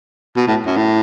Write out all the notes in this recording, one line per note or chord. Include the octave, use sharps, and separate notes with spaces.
B2
A2
F#2
A2